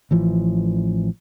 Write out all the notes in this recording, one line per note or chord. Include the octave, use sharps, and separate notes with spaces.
A1 E3 F3